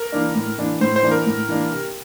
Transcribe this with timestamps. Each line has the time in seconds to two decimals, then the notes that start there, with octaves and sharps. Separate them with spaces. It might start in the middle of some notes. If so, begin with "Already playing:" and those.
Already playing: A#4
0.12 E3 A#3 D4
0.35 A2
0.58 E3 A#3 D4
0.81 A2 C5
0.96 C5
1.03 E3 A#3 D4
1.11 A#4
1.26 A2
1.49 E3 A#3 D4
1.72 C3